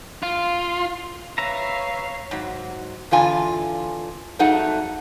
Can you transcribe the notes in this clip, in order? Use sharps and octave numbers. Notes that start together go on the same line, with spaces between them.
F4
B4 C#5 E5 F5 A#5
G#2 F#3
E2 D3 F4 G#5
F2 F#3 A3 D#4 G#4 F#5